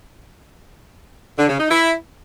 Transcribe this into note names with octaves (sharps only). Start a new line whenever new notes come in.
D3
C#3
D#4
E4